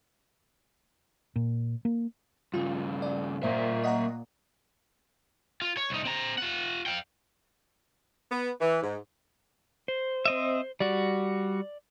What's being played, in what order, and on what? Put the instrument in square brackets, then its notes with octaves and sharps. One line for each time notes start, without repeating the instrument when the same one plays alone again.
[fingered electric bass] A#2
A#3
[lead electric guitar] G2 C#3 [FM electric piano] F4
[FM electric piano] D5
[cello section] A#2 [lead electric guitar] A#3 E5 [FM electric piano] C5
[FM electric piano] D#5 F#5 A#5
[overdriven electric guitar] F4
C#5
C2 D#4
C4 A#5
F4 F#5
F5 G5
[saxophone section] B3
E3
G#2
[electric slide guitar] C5
[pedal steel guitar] C4 D#5 E5
[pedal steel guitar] G3 F#4 [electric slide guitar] D5